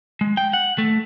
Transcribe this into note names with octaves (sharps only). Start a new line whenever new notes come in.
G#3
G5
F#5
A3